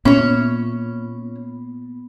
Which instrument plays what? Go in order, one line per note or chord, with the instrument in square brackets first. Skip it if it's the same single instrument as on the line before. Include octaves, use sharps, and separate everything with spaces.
[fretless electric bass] A#2 [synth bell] B3 B5 [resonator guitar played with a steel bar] C#4 C#5